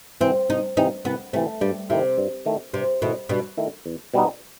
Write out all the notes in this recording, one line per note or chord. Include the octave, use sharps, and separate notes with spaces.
C3 E3 C4
C2 D#4
C3 E3 D#4
C2 B3
C3 E3 A3
G2 G3
C3 D#3 A3 E4
G2
D#3 A3 E4
G2 C3
B2 D#3 A3 E4
G2 B2
D#3 A3 E4
E2
B2 G3 B3 D#4